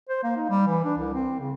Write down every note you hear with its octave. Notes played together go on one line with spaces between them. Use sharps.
C5
A#3
D#4
G3
E3
D4
C2
C4
C#3